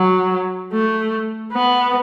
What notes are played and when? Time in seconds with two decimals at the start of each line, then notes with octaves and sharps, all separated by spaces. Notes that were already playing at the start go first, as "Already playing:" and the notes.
Already playing: F#3
0.73 A3
1.52 B3